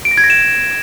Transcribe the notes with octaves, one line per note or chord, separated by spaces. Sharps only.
D7
A#6
G#6
A#6
E7